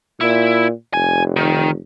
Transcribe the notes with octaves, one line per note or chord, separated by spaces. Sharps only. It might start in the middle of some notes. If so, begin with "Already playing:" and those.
A#2 E4
F1 G#5
D#3